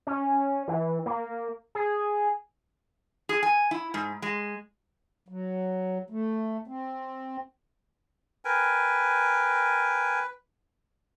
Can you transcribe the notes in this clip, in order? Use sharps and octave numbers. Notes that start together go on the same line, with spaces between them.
C#4
E3
A#3
G#4
G#4
G#5
E4
G#2
G#3
F#3
A3
C4
A#4 B4 G5 G#5